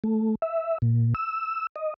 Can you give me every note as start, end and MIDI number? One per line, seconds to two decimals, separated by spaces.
0.04 0.35 57
0.42 0.78 76
0.82 1.14 46
1.15 1.67 88
1.76 1.94 75